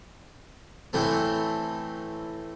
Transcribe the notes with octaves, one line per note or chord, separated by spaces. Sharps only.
A2 E3 A3 C4